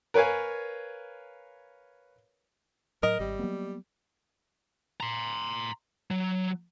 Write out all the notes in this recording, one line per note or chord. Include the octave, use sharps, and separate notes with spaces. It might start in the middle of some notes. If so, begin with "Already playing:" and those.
A#4 B4 C#5 F5 G#5
A2 F#3 A#4 D#5
G#1 G3
F#3 A#3 B3
A#5 C6
F#3